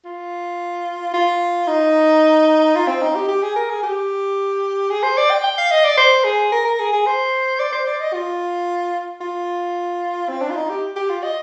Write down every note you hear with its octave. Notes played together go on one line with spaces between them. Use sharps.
F4
F4
D#4
F4
C4
D#4
G4
G4
G#4
A#4
G#4
G4
G#4
C5
D5
G5
G5
F5
D#5
D5
C5
G#4
A#4
A#4
G#4
G#4
C5
D5
C5
D5
D#5
F4
F4
C4
D4
F4
D#4
G4
G4
F4
D#5